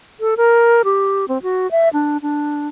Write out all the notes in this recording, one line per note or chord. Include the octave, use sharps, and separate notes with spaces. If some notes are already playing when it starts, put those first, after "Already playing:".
A4
A#4
G4
C4
F#4
E5
D4
D4